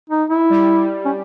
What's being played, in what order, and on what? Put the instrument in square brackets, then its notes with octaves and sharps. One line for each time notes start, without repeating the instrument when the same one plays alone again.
[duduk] D#4
E4
[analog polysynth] G3
[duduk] C#4